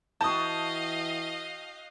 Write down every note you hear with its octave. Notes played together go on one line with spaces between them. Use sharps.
E3 F#4 D#5 F5 G5 A5 D#6